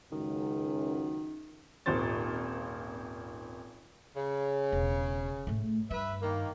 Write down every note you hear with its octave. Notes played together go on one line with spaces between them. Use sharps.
C#2 F#2 D#3
D#1 G#1 F4 C5 A6
C#3
E1
A2 A3
G2 B4 E5
D#3 A#3